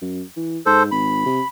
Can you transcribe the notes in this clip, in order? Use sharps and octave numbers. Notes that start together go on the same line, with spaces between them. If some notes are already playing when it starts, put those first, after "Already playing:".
F#2
E3
G#2 A4 C5
G#1 B5
C3